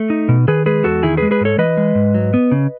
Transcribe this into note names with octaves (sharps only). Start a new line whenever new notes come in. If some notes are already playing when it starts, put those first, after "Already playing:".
Already playing: A3
D#4
B2
D#3 G#4 B4
G#3 G#4 B4
E2 F#4 A4
D#3 E4 G#4
G#3 G#4 B4
G#4 B4
G#2 A4 C#5
E3 B4 D#5
G#3
G#2
F#3
B3
C#3